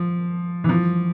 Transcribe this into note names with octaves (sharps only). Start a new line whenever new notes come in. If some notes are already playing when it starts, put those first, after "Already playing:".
Already playing: F3
E3
F3